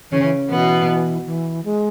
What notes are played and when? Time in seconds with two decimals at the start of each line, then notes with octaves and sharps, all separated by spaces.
0.11 C#3 E3 C#4
0.21 E3
0.49 B2 E3 B3
1.26 E3
1.65 G#3